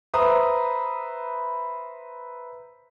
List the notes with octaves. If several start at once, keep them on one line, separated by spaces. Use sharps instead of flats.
B4 C5 E5 A#5 D#6